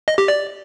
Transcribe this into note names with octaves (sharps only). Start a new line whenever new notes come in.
D#5
G4
D5